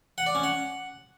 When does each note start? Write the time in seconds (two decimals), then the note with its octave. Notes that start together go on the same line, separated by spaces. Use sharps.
0.18 F#5
0.26 D5
0.35 C#4
0.43 F#5